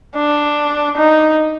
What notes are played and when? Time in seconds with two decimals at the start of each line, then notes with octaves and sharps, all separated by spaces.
0.16 D4
0.97 D#4